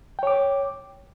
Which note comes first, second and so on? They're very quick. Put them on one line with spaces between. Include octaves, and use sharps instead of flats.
G5 C#5 D6